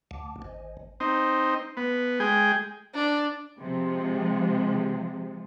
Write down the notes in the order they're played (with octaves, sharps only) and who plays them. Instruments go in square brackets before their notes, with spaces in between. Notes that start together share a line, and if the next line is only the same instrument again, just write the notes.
[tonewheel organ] D2
G#1
[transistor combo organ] C4 D#4
B3
G#3 G#4 G5
[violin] D4
[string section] C3 F3 G#3